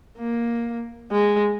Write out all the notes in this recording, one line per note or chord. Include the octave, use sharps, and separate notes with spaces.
A#3
G#3